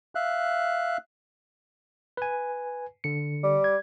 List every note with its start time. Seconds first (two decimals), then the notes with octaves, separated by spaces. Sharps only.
0.15 E5 F5 F#6
2.17 B4 G#5
3.04 D3 C#7
3.43 G3
3.64 G#6